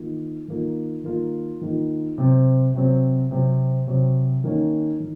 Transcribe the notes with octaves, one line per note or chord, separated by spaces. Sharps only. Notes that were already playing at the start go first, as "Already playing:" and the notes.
Already playing: D#3 A#3 F4
D#3 A#3 F4
D#3 A#3 F4
D#3 A#3 F4
C3 F#3 C4
C3 F#3 C4
C3 F#3 C4
C3 F#3 C4
D#3 A#3 C#4
D#3